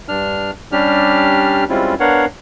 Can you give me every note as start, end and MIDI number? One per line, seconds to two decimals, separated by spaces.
0.08 0.51 43
0.08 0.51 62
0.08 0.51 89
0.72 1.64 55
0.72 1.64 61
0.72 1.64 62
0.72 1.64 67
0.72 1.64 89
1.70 1.94 55
1.70 1.94 56
1.70 1.94 60
1.70 1.94 61
1.70 1.94 64
1.70 1.94 65
2.00 2.25 59
2.00 2.25 62
2.00 2.25 70
2.00 2.25 73
2.00 2.25 77
2.00 2.25 78